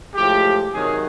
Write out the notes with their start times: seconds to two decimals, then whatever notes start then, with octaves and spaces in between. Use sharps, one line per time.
0.14 A2 F3 G#3 G4
0.73 C3 D#3 F#3 G#4